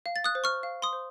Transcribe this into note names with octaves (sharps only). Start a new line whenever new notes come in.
F5
A6
D#6 F#6
C5
C#6 F6
F5
C6 D#6
C5